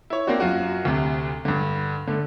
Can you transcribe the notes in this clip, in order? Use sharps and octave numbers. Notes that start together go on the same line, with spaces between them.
E4 C#5
A#3 C4 D4 F#4
F#2 F4 F#4
D2 C3
G2 D3
D3 A3